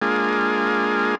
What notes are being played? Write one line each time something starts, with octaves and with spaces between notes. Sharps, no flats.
G#3 A#3 D4 F4 G#4